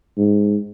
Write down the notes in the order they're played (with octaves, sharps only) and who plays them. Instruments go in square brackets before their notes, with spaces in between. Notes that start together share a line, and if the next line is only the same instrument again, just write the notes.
[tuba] G#2